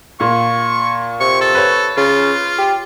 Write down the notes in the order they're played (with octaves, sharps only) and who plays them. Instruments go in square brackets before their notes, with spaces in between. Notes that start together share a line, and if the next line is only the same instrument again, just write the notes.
[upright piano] A#2 F5 [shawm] C#6
[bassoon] C3 [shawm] C#6
[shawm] A4
[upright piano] B4 C#5
[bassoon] C#3 [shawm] F4
[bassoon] G4